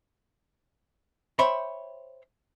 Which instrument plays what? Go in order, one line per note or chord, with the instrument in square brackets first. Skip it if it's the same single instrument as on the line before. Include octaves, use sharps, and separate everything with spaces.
[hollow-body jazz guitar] C5 C#5 E5 G5 B5 C6